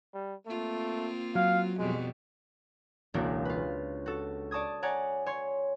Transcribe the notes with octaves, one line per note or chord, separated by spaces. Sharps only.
G3
A3 A#3 C4 F4
F#3 F5
F2 B2 G3 G#3
E1 C#2 A#3 D4 F#4
F4 B4
F#4 A4
D5 A5 C#6 D#6 G#6
C#5 D5 F#5 G#5 A#5
C#5 C6